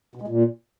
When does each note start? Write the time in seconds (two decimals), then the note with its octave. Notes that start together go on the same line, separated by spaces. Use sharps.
0.15 B2
0.22 G#3
0.28 A#2